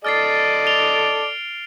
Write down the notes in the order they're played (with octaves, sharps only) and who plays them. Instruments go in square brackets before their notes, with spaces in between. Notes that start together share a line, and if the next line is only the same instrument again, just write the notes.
[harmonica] A4 D5 D#5 [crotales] F6 A6 C7
[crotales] D7 F7 G7